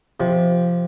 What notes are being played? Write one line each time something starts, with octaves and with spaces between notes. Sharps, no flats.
C3 F3